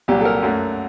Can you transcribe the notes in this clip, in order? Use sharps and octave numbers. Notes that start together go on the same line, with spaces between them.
C2 A#2 F#3 G4
A4
A#4
F#2 F#3 A3